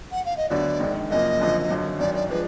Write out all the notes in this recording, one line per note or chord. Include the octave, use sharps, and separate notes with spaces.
F#5
F5
D#5
D2 D3 F#3 B3 D5
A#1 G#2 D#3
F#1 F#2 F3 A#3 D#5
G#1 F#2 D3 F3
G#1 F#2 D3 F#3
G#1 F#2 D#3 F#3 D5
D5
F3 G#3 D4 B4